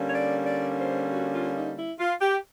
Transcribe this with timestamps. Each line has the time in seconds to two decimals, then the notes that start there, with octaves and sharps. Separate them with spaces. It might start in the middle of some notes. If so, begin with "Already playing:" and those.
Already playing: D3 G3 A#3 C#4
0.08 C#5
0.12 D5
0.45 D5
0.78 C5
1.11 F#4
1.33 F4
1.55 D#4
1.77 E4
1.98 F4
2.20 G4